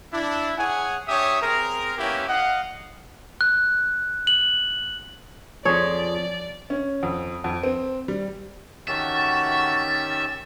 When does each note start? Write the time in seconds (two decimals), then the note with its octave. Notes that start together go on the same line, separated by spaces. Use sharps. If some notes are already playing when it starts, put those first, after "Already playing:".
0.13 D4 E4
0.58 G#4 C#5 F#5 G#5
1.08 D4 G4 C#5 E5 D#6
1.41 C4 G#4 A#4
1.98 A#3 B3 C#4 E4 G4
2.28 D#5 F5 F#5
3.41 F#6
4.27 F#7
5.65 F2 F3 G#4 C#5 D5
6.70 C#4
7.03 F2
7.44 F2
7.63 C4
8.08 G3
8.88 D#3 A3 C#4 F#4 G4 E5 A6